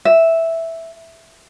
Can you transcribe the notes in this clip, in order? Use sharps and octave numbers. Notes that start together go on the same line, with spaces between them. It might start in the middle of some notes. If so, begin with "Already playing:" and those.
E5